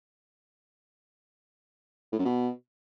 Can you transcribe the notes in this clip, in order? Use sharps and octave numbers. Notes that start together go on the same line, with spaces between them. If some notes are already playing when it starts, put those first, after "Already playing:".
A2
F#2
B2